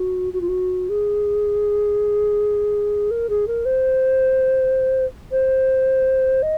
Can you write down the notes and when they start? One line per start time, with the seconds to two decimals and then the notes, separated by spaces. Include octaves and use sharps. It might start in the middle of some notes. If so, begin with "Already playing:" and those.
Already playing: F#4
0.33 F#4
0.41 F4
0.48 F#4
0.89 G#4
3.11 A#4
3.29 G#4
3.47 A#4
3.65 C5
5.32 C5
6.42 D#5